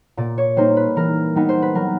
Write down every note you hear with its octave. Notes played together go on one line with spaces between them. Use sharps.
A#2 D5
C#5
G3 A#3 D#4 C5
B4
E3 A#4
G3 B3 D#4
C5
B4
F#3 A#4